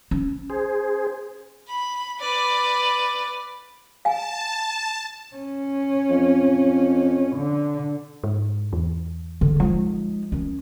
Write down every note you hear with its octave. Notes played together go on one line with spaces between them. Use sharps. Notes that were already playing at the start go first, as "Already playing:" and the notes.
C#4
G#4 C5
B5
B4 D5
F5 G#5 A5
C#4
F2
D3
G#2
E2
D3
F3 G#3 D#4
D#3 C#4